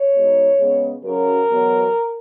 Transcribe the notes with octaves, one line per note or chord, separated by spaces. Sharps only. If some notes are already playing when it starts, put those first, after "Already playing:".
Already playing: C#5
B2 G#3 D#4
C#3 G#3 B3
F#2 C#3 F#3 A#4
E2 B2 F#3